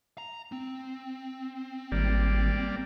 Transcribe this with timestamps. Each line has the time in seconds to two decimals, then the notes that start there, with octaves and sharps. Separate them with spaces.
0.18 A#5
0.52 C4
1.92 G#1 G3 A#3 D5